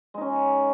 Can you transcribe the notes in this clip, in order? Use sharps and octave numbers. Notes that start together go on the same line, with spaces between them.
G#3 C#4 D#4